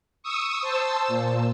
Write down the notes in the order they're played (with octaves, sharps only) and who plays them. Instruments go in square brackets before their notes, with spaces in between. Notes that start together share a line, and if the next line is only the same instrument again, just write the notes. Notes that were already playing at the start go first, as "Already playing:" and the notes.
[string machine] C#6 D#6 E6
C5 A5 E6
A#2